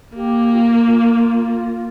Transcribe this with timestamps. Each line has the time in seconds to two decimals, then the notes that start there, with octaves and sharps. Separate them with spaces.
0.15 A#3 G4
0.53 F4
0.90 F4